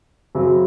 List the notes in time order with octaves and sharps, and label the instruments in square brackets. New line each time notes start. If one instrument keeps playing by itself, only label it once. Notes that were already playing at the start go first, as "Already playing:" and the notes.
[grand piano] F#2 C#3 F#3 C4